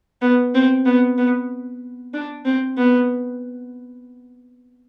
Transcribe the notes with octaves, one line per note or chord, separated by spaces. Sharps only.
B3
C4
B3
B3
D4
C4
B3